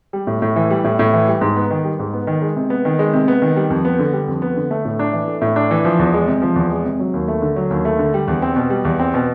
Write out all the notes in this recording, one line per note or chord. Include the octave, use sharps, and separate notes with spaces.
G3
A2
A2
E3
G3
A2
A2
E3
G3
G#2
B3
D#3
G3
G#2
B3
D#3
G#3
C3
B3
D#3
G#3
C3
B3
D#3
G3
F2
B3
D3
G3
F2
B3
D3
A3
A2
D4
E3
A3
A2
D4
E3
F3
E2
G#3
C3
F3
E2
G#3
C3
F#3
D#2
A3
D3
F#3
D#2
A3
D3
G3
E2
C4
B2
G3
E2
C4
B2